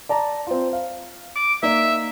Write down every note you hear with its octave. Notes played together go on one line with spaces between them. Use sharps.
D5 A5 A#5
C4 F4
F5
D6
A#3 D#4 D5 E5